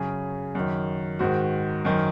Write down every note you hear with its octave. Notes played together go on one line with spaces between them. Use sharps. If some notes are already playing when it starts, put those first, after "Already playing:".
Already playing: F#2 C#3 G#4
F#2 D#3
G#2 D#3 F#4
F#2 D#3